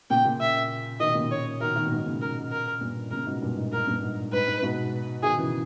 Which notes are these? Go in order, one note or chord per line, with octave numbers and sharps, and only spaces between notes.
A#2 C#3 G5
A#2 C#3
E5
B2 D#3 D#5
A#2 C#3
C#5
B2 D#3 A#4
B2 D#3
A#2
G#2 B2
A#2 C#3
A#4
A#4
G2 A#2
A#2 C#3 A#4
G#2 B2
G2 A#2
G#2
G#2 A#4
G2 A#2
G#2
G#2 B4
G#2
G#2 B2
B2 D#3 G#4
C#3 E3